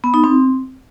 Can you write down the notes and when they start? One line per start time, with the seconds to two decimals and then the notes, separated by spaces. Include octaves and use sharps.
0.04 B3
0.14 D#4
0.24 C4